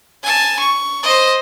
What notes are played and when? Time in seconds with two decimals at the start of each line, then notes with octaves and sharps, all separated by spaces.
0.23 G#5 A5
0.60 C#6
1.03 C5 D#5